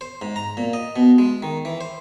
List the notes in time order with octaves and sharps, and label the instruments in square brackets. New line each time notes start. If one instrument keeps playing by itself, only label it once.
[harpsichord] C5
G#2
A#5
A#2
D#5
B2
G#3
D#3
E3
C5